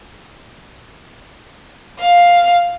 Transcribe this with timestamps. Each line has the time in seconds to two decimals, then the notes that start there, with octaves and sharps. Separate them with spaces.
2.02 F5